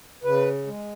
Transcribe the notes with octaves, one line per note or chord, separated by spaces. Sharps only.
C#3 B4
G#3